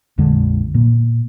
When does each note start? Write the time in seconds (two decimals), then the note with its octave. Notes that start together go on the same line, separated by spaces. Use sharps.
0.18 A#1 F2 D3 G#3
0.74 A#2 A#3